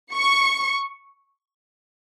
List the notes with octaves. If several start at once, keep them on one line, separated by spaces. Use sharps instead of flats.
C#6